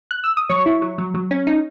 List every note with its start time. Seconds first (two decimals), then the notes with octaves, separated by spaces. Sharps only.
0.11 F#6
0.24 E6
0.37 D#6
0.49 F#3 C#5 C#6
0.66 E4
0.82 F#3
0.98 F#3
1.14 F#3
1.31 C#4
1.47 D#4